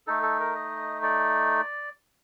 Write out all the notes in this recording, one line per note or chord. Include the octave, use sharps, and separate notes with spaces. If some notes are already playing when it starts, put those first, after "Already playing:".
A3 D#4 A4
A4
A#4
D#5
D5